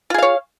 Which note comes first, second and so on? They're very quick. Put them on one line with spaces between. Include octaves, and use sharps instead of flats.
F4 G#4 F5 C#5